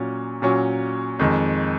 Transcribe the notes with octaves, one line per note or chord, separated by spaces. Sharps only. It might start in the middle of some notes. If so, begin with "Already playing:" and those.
Already playing: A#2 F#3 C#4
A#2 F#3 C#4
F2 D#3 G#3